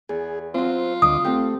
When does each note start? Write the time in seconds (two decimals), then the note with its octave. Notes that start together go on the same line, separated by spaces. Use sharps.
0.09 E2 G#4
0.54 F#3 C4 F4 C5
1.02 D2 D#5 D6 D#6
1.25 A3 C4 F#4 G4